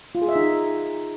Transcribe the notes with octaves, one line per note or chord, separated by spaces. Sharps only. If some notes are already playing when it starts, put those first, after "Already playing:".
F4
G#4
E5
D#4